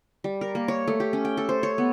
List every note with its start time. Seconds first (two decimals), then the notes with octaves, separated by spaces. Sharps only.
0.24 G3
0.41 A#4
0.55 A#3
0.68 C#5
0.88 A3
1.00 G4
1.13 C#4
1.25 G5
1.37 A4
1.49 C5
1.63 C#5
1.78 B3